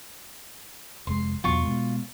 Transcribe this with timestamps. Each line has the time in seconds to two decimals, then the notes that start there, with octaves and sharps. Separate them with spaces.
1.07 F1 G#3 C6
1.44 E2 B2 F#3 F4 C#6
1.63 B2 G#3